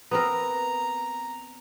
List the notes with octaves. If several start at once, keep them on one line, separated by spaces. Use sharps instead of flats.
B3 C4 A#4 A#5